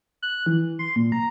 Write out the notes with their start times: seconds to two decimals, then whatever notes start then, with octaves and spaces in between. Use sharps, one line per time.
0.22 F#6
0.46 E3
0.79 C6
0.96 A#2
1.12 A#5